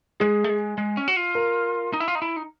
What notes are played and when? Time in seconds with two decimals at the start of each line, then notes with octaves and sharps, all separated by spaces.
0.20 G#3 G#4
0.44 A3
0.49 G#3
0.78 G#3
0.97 C#4
1.08 F#4
1.16 F4
1.35 A#4
1.93 D#4
2.00 E4
2.08 F4
2.15 D#4
2.22 E4
2.36 D#4